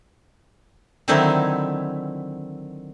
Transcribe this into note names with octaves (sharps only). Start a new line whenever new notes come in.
D3 D#3 F#3 C4 D#4 E4